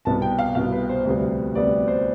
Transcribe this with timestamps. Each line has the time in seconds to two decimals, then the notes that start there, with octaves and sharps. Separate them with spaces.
0.05 C2 B2 B3 A5
0.22 G5
0.38 F5
0.55 C2 B2 B3 F5
0.72 B4
0.89 C5
1.05 D2 C3 G3 B3
1.55 D2 C3 G3 B3 D5
1.88 C5